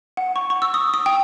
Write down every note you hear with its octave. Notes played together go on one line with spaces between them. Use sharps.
F#5
C#6
C#6
E6
D#6
D#6
G5